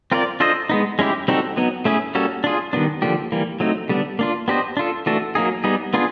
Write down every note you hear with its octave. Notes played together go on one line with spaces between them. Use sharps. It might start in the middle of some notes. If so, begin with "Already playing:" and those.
C4 F4 A#4 D5
D4 F4 A4 C5 D#5
G#3 B3 D#4
G#3 C#4 E4 G4
G3 C4 D#4 F#4 A4
F#3 B3 D#4
A3 C#4 E4 G#4
G3 A#3 C#4 F#4 A4
D4 F4 G#4
D#3 G3 B3 D4
D3 F3 A#3 D4 G4
E3 G3 A#3
F#3 A3 C4 D#4
D3 G3 B3 D4
A#3 D4 F4
B3 D4 G4 C5 D#5
D4 F4 A4
E3 A3 D4 F#4 A4
F#3 A#3 D#4 G#4
G3 B3 D#4 G#4
B3 D4 F4 G#4